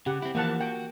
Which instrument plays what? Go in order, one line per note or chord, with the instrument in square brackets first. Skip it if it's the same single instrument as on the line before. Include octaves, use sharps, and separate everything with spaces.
[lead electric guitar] C#3 [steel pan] G4 F#5
[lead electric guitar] C4 E4
[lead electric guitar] E3 F3 [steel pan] A#3 F#5 A5
[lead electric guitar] F#4 [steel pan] G5